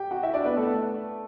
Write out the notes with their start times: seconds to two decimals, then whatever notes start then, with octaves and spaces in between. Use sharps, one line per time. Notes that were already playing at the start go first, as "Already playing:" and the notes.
Already playing: G4 G5
0.11 F#4 F#5
0.23 E4 E5
0.34 D4 D5
0.45 B3 B4
0.56 A3 A4